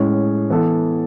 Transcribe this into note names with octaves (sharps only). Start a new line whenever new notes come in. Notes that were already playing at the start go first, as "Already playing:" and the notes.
Already playing: A2 G#3 C#4
E3 B3 E4 A4